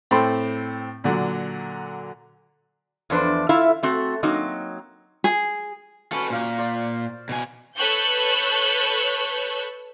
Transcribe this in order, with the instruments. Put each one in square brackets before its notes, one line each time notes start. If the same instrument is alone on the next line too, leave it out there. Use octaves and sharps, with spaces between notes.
[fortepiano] A2 C4 A4 B5 C6
A#2 D3 F#3
[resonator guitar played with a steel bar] E2 F3 D4 B4 C5
E4 F4 A4 E5 F5
A3 C4 F#4
F#3 A#3 C4 D#4 F#4 D#5
[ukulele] G#4
[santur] C#4 F#4 [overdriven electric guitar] A4 B4
[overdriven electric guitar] A#2 [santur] C5 F5
[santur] C5 D5
[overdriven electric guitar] B2 G#5
[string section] A4 B4 C#5 C#6 F#6 G6